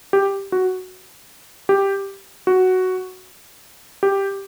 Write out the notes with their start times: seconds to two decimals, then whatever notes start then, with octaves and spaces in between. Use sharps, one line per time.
0.13 G4
0.52 F#4
1.69 G4
2.47 F#4
4.03 G4